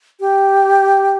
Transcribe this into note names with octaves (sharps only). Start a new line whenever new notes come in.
G4